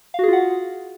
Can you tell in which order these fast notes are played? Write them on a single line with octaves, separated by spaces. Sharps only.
F5 F#4 G#4 F4 F#5